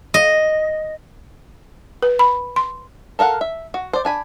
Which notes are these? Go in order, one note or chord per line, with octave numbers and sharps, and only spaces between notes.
D#5
B4
B5
C6
A4 A#4 F5 F#5
E5
F#4
C5 D5
D4 G#5 B5